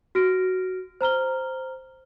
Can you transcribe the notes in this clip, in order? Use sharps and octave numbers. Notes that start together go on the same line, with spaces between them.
F#4 F6 A#6 D7
C5 A#5 F6 G7